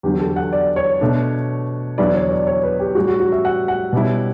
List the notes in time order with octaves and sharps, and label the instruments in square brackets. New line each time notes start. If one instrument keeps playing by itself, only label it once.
[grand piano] E2 D3 F#3 G4
A4
F#5
D5
C#5
B2 A3 D4
E2 D3 F#3 B3 E4 D5
C#5
D5
C#5
B4
G4
A2 G3 C#4 F#4
F#4
F#4
E5
F#5
F#5
B2 G3 C#4 E4